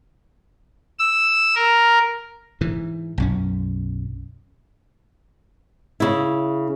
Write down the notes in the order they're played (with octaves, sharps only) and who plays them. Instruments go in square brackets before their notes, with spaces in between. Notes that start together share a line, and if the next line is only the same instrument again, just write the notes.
[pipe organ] E6
A#4
[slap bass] G#2 E3
B1 F#2 C#4
[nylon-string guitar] C#3 E4